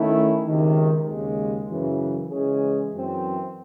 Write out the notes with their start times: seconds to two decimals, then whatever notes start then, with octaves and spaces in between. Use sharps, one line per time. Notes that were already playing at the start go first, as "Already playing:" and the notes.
Already playing: D#3 A3 C#4 E4
0.46 C#2 C3 D#3
1.08 D#2 C#3 G#3
1.70 F#2 C#3 E3
2.31 C#3 E3 G#3 C#4 G#4
2.92 F#2 E3 C4